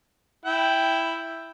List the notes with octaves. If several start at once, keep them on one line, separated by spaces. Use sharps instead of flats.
E4 G5